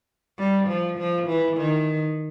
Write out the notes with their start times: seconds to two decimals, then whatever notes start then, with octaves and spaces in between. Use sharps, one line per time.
0.38 G3
0.68 F3
0.98 F3
1.27 E3
1.57 D#3